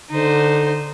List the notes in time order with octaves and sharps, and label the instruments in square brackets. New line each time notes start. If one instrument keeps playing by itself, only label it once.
[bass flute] D3 [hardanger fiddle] D#4 C5